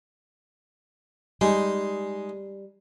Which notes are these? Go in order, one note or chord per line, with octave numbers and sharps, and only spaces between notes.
G3 G#3 D#4 G#4